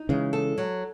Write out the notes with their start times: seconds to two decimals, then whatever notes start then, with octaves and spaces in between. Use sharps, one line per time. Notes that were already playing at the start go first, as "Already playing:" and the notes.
Already playing: D#4
0.09 C#3 E3 G#3
0.33 A4
0.58 F#3